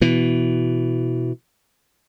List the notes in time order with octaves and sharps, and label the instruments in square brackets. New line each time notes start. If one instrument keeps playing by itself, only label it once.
[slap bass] B2 E3